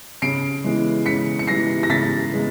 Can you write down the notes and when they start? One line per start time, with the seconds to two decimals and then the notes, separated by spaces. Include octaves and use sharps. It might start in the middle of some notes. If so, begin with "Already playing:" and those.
0.22 C#3 C7 D7
0.64 E3 G#3 B3
1.06 C#3 B6 C#7
1.39 C#7
1.47 E3 G#3 B3 A#6 C7
1.83 A#6
1.90 C#3 A6 B6
2.32 G#3 B3